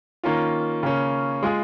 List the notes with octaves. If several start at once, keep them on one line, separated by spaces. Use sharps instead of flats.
D#3 A#3 C#4 F4
C#3 A#3 C#4
G#3 F4 G#4